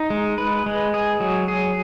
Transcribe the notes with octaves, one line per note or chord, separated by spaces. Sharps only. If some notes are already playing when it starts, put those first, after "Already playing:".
Already playing: D#4
G#3
B4
G#3
G#4
F#3
G#4